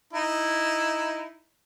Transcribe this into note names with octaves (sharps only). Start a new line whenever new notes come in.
D#4 E4